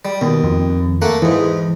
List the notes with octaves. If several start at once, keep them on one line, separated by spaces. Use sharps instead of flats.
G3
D#2 B2
F2
A3 A#3 F#5
E2 G#2 E3